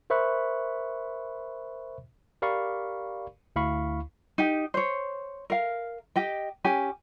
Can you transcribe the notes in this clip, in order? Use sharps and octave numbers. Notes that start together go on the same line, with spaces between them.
A#4 C5 E5 B5 C#6 F#6
G4 A#4 D5 F5 B5 C#6
D2 E4 F5 B5 C#6
D#4 G4
C5 C#5
A#4 F5
G4 D#5 G5
C#4 G4 G#5